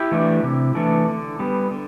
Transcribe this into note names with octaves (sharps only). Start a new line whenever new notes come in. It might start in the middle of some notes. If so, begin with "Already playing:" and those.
Already playing: E4 G4
E3 A3 D4
C3
E3 A3 D4
D3
G3 B3
D3